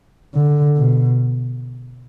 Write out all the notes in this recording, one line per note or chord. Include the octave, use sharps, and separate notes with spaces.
D3
B2